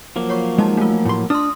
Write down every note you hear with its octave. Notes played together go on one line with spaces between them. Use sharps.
F3 F#3 A#3
C#5 C#6
G#3 D#4 A5
A3 F4
A2 C6
D4 C6 D#6 F6